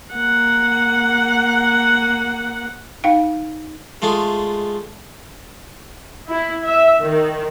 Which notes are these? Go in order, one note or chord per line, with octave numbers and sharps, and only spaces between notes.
A#3 F#5
D#4 F5 G5
G#3 A3 F4 G#4
E4
E5
D#3